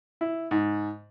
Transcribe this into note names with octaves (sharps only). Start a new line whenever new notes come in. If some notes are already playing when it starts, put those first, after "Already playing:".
E4
G#2